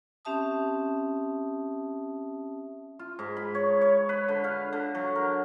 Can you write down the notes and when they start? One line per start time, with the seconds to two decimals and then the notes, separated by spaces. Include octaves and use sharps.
0.25 C4 C#4 G4 E5 A5 D#6
2.99 F4
3.19 G#2
3.37 B5
3.55 C#5
3.81 C#5
4.09 B4
4.28 D3
4.44 F5
4.73 D3
4.95 F#3
5.15 A#4